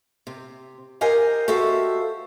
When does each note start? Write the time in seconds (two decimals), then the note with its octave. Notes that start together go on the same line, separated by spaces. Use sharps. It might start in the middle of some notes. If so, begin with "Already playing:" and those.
0.27 C3
1.01 G4 A#4 C5 D#5 F5 G#5
1.48 F#4 G4 A4 C5 E5 F5